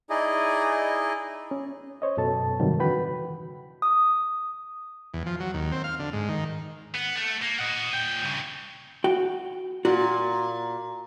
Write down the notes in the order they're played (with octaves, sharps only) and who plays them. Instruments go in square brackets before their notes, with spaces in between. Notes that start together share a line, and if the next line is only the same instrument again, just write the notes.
[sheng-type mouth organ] D#4 E4 G#4 D5 D#5
[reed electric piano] C#4
C5 C#5 D#5
F#2 B2 A4 A5
G#2 C3 D#3 F#3 G3
D3 E3 F#4 B4 G5 B5
[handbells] D#6
[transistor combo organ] E2
F3
F#3
D#2
C4
F5
D3
G#2
D#3
[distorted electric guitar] B3
A3
A#3
D#5 F#5
A#2 G5
G2 C#3
[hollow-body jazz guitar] F#4 G5
[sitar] A#2 [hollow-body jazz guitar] F#4